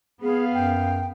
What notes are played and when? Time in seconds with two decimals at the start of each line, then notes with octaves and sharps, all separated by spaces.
0.22 B3 G#4 F5
0.54 F#2 G5